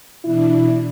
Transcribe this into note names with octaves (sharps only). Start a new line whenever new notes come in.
B2 E3 D4 E4